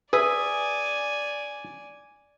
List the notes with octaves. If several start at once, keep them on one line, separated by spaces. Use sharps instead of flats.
G#4 B4 D5 E5 G#5